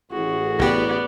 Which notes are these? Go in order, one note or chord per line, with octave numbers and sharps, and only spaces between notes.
A1 F#4 G#4
C2 B3 G4 D5